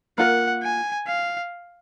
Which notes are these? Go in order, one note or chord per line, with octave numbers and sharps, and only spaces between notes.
A#3 F4 A#4 F#5
G#5
F5